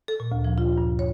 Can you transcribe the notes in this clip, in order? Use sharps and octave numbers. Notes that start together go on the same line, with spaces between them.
A4
A#2
D2
F3
F4
G2
C#5